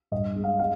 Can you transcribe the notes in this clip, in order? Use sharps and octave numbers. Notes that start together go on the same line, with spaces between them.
G2 D#5
G#3
F5
G#3 F5